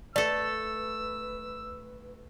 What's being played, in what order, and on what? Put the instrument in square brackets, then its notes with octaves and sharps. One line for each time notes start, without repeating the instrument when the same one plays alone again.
[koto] A3 A4 [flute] B4 [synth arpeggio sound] D5 [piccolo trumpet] E6